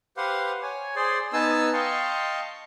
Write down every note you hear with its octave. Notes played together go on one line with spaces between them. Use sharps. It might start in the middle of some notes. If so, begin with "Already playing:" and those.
G4 B4 C5 F5 F#5
C#5 G#5
G#4 C5 D5 C6
B3 D#4 G#5 A5 E6
D#5 F5 G5 A5 C6 C#6